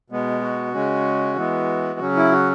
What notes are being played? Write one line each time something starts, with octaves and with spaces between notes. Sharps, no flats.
B2 G#3 B3
F#4
C#3 G#3 C#4
E3 G#3 B3
C#3 F#3 C#4
E4
F#4